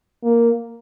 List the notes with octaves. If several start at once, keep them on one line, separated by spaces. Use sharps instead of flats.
A#3